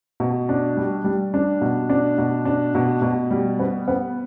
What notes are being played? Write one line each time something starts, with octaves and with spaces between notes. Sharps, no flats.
B2
D4
G3
G3
D4
B2
D4
B2
D4
B2
B2
G3
B3
B3